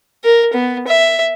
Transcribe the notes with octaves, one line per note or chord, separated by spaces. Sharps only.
A#4
B3
E5